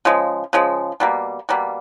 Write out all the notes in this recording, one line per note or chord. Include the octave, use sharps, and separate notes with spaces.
C#3 F3 G#3
C#3 F3 G#3
B2 G3 A#3
B2 G3 A#3